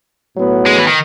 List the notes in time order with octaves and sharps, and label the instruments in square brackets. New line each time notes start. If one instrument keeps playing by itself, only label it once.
[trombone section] A2 F#3 B3
[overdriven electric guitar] G#3
E3
D#3